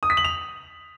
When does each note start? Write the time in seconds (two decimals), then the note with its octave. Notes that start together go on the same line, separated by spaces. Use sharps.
0.03 D#6
0.10 B6
0.17 F#7
0.24 F7